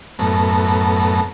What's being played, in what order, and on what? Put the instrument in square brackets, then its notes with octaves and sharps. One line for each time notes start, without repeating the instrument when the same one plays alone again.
[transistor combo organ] F#2 A2 B3 A4 A#5